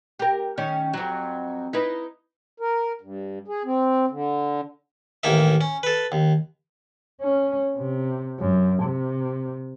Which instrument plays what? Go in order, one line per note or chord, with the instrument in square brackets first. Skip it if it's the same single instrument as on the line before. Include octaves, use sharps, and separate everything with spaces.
[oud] G4 A#4
D#3 C#4
F2 F#3
D#4 E4 B4
[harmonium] A#4
G2
G#4
C4
D3
[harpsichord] A1 D#2 A#3 D#4 E5
C#4
A4 B4
D#2
[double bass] C#4
C3
F#2
C3